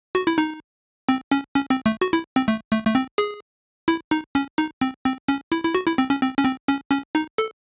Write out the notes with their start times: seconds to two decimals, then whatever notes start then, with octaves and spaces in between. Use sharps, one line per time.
0.15 F#4
0.27 E4
0.38 D#4
1.09 C4
1.31 C#4
1.55 C#4
1.70 C4
1.86 A3
2.01 F#4
2.13 E4
2.36 C4
2.48 A3
2.72 A3
2.86 A3
2.95 C4
3.18 G#4
3.88 E4
4.11 D#4
4.35 C#4
4.58 D#4
4.81 C4
5.05 C4
5.28 C#4
5.52 E4
5.64 E4
5.75 F#4
5.87 E4
5.98 C4
6.10 C#4
6.22 C4
6.38 C#4
6.45 C4
6.68 C#4
6.91 C#4
7.15 D#4
7.38 A4